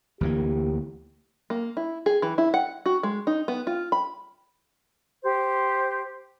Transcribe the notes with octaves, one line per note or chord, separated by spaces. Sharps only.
D2 E3 A#3 G4
A#3
E4
G#4
E3
E4
F#5
F#4
G#3
D#4
B3
F4
B5
G4 C5